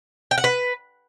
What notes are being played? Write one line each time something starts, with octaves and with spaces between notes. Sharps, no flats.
G5
F#5
B4